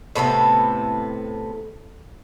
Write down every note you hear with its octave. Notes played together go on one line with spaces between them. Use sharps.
A2 C3 B3 A4